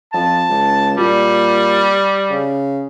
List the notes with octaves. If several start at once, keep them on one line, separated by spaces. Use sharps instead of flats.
F2 A5
C#2
A#2 G3
C#3